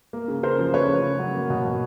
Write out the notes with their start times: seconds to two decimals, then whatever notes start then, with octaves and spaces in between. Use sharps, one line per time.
0.13 A#3
0.28 C#3
0.43 C#3 A#4 C5
0.59 F3
0.73 A3 B4 C#5
0.89 C#3
1.04 C#3
1.19 F#3
1.35 A#3
1.50 B2
1.66 B2